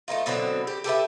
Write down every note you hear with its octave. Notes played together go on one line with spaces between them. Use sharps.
A3 C4 D#4 F4
B2 D3 F#3 C4
G4
G4 A4 B4 E5